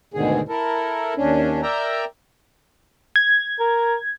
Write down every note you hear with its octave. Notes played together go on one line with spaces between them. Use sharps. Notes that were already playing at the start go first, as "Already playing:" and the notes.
D2 G#2 B2 D3 D#3 G#4
E4 A4 A#4
D#2 C#4 D4
A#4 D5 E5 G5 A#5
G#6
A#4